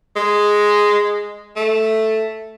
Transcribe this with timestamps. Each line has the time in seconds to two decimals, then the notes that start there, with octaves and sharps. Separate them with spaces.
0.16 G#3
1.56 A3